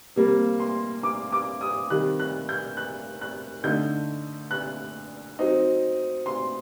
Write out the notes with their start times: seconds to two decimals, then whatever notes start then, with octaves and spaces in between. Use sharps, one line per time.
0.16 C3 G3 A#3
0.60 C6
1.03 D6
1.32 D6
1.61 D#6
1.90 C3 D#3 G3 F#6
2.20 F#6
2.49 G6
2.77 F#6
3.21 F#6
3.64 D3 A3 D#4 G6
4.51 F#6
5.39 F#3 C4 D#4
6.26 C6